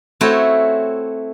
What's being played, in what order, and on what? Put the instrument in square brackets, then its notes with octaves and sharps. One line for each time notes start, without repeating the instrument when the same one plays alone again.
[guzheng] A3 C4 E4 F#4 C#5 G5